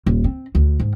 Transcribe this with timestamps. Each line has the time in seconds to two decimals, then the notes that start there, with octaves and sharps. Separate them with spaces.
0.06 D#1
0.24 C4
0.55 D2
0.79 G#2